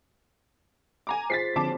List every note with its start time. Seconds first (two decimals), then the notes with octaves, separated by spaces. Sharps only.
1.07 G#5 A#5 D6
1.30 F4 G#4 C5 A6 B6 C7
1.56 D3 F3 C4 A5 D6